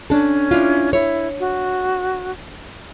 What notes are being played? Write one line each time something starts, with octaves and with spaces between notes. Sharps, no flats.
C#4 D4 A4
D4 E4 F4
E4 C#5
F#4